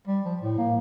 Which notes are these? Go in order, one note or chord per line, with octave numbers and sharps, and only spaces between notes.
G3
F3
A2
A#3